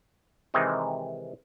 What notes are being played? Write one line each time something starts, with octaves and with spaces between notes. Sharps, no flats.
C3 D#3 E3 G#3 C4 D#4